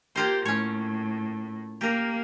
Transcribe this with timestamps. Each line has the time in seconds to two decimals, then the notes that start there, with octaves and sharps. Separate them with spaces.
0.16 A#3 F4 G4 C5
0.45 A2 C#4 C#5
1.81 A#3 G4 A#4